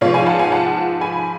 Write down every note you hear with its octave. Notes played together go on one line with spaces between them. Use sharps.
G#2 F3 B3 F4 C#5 F5
F5 G#5
F#5 A5
F5 G#5
F#5 A5
G#5 B5